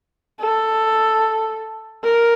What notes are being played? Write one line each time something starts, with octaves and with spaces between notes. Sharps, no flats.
A4
A#4